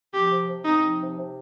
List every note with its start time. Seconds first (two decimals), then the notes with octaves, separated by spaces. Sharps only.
0.14 F3 G4
0.30 C3
0.48 C3
0.64 C4 D#4
0.82 F3
0.99 C3
1.17 C3